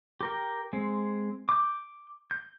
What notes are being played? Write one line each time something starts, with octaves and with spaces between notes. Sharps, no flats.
G4 A#4 G5
G#3 C4
D6 G6
G6